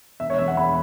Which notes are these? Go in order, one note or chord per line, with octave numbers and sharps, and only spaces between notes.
E1 E5
C#5
E2 E5
F#5
E2 B5